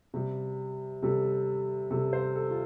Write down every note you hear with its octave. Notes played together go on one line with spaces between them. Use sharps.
C3 G3
C3 G3 A4
C3 G3 A4
C5
A4
F4